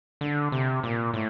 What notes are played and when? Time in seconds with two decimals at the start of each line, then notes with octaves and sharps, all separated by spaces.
0.21 D3
0.52 C3
0.83 A#2
1.14 A2